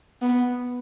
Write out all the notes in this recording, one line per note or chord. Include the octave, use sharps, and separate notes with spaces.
B3